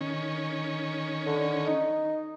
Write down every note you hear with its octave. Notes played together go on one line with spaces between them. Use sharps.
D#3 C#4
D3
D#4